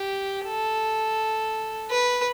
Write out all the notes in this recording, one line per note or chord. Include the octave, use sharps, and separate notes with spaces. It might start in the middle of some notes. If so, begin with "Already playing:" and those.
Already playing: G4
A4
B4